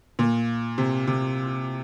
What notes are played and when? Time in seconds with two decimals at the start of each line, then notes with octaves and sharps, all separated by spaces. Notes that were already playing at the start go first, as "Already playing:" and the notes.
0.19 A#2
0.78 C3
1.07 C3